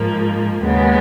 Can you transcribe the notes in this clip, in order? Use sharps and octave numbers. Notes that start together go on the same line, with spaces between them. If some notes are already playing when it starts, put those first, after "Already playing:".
Already playing: G#2 F3 A#3
D#2 C#3 G#3 B3